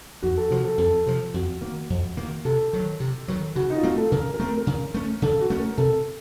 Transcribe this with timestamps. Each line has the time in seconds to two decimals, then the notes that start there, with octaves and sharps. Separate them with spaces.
0.22 F2 F#4
0.37 A4
0.50 C3 F3 F#4
0.64 A4
0.78 F2 A4
1.06 C3 F3
1.34 F2 F#4
1.61 D#3 A#3
1.90 F2
2.17 D#3 A#3
2.45 C3 A4
2.73 D#3 F#3
3.00 C3
3.28 D#3 F#3
3.55 C#3 F#4
3.70 D#4
3.77 F4
3.83 A3 C4 F#4
3.97 A4
4.12 C#3 A#4
4.34 A#4
4.40 A3 C4
4.57 A#4
4.67 C#3
4.94 A3 C#4
5.22 C#3 A4
5.41 F#4
5.50 A3 C#4
5.59 A#4
5.77 C3 A4